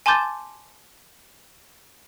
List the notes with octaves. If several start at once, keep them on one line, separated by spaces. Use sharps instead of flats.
G#5 A5 C6 D6 G6 A6